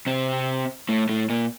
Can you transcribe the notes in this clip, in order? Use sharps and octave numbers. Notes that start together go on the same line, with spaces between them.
C3 C4
A2 A3
A2 A3
A#2 A#3